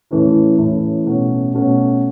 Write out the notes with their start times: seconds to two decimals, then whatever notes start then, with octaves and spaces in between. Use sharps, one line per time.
0.11 A2 E3 A3 C#4 E4
0.58 A2 E3 A3 C#4 E4
1.06 B2 A3 C#4 F#4
1.54 B2 A3 C#4 F#4